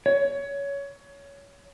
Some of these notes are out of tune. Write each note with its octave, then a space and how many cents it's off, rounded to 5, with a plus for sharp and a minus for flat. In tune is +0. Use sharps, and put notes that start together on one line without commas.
C#5 +20